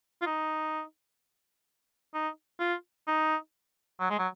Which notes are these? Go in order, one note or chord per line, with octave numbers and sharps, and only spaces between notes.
F4
D#4
D#4
F4
D#4
F#3
G#3
F#3